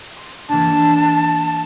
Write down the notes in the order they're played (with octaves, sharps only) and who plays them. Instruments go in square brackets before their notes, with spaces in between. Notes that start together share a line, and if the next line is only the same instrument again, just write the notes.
[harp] C6
[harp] E3 A#3 D4 [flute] A5